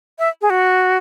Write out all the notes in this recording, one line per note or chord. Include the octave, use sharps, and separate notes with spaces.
E5
G#4
F#4